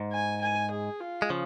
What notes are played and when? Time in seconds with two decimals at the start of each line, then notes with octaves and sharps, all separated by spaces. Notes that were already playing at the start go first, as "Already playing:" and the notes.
Already playing: G#2
0.12 G#5
0.41 G#5
0.71 G#4
1.00 F4
1.22 G#3
1.30 C#3 F3